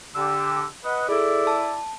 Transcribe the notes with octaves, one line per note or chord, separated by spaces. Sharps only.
D3 G4 E6
B4 D#5 F#5
E4 G#4 A4 D5
A5